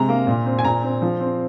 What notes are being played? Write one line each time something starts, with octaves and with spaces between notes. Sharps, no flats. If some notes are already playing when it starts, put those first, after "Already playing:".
Already playing: C3 G#3 A#5
A#3
A#2
C4
G#5
A#2 A#5
C4
F3
C4